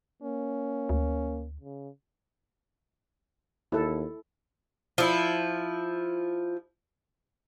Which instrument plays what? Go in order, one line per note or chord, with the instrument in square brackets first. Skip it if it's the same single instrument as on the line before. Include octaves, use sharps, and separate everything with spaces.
[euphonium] A#3 [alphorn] C#4
[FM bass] D2
[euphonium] C#3
[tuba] D#2 [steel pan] E4 A4
[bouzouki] F3 E4